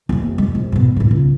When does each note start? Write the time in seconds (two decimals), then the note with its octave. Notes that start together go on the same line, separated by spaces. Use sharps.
0.09 F1 A#3
0.38 G#3
0.55 A#1
0.72 G#2 B2
0.96 B1 A2
1.11 C#2